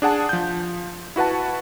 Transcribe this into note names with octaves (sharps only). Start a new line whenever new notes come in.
D4 G#4 F#5 A5
F3 G6
E4 F#4 B4 F#5 A5